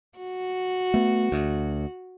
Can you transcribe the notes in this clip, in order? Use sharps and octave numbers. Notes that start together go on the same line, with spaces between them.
F#4
A3 B3
D2